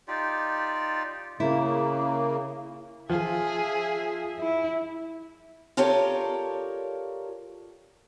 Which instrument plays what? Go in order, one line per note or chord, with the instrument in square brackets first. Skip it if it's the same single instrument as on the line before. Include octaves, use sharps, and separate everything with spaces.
[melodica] D#4 F4 G4 D5
[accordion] C#3 A#3 [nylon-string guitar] E4
[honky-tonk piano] F3 [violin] G#4 E5
[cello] E4
[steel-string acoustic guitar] F4 G4 A4 A#4 C#5 D5